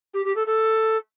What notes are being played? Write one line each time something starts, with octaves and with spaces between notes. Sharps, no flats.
G4
G4
A4
A4